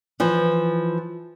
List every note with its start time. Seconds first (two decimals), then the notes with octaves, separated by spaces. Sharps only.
0.20 E3 F3